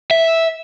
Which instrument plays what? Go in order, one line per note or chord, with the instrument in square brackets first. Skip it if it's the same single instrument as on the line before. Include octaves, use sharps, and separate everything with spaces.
[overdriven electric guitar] E5